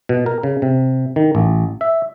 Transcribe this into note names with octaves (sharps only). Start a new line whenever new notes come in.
B2
A#4
C#3
C3
D#3
A1
E5